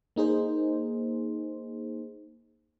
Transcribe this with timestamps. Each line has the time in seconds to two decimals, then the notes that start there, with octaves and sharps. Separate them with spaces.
0.16 A#3 D#4 G#4 C5